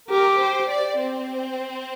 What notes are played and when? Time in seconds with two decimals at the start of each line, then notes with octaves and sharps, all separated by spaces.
0.10 G4 A#4
0.40 C5
0.69 D5
0.98 C4